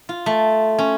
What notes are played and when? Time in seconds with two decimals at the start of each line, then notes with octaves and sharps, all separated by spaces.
0.09 F4
0.26 A3
0.79 C#4